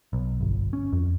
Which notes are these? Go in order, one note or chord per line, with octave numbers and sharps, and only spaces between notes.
B1
G1
C#4
F2